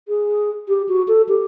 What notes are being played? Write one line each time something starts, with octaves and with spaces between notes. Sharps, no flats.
G#4
G4
F#4
A4
G4